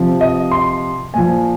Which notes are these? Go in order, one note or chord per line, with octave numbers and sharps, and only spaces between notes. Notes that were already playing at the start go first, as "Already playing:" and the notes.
Already playing: C3 F3
D#5
C6
A#2 F3 G#5